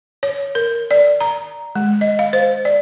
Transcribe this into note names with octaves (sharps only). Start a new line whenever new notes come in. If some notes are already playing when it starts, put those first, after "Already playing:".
C#5
A#4
D5
A#5
G#3
D#5
F5
C5
D5